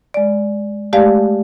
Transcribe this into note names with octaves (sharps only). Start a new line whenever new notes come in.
G#3 D5
G#3 A3 G4 D5 F5